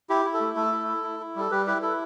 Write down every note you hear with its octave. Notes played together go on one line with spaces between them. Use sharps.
E4 G4
E4
A4
A3
A3 A4
E4
E4
E4
E4
G3 A4
G3 G4 B4
E4 G4 B4
E4 A4